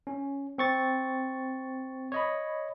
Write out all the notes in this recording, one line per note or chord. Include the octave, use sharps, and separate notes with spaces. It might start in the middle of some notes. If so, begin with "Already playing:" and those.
C#4
C4 C#6 A6
C#5 D#5 B5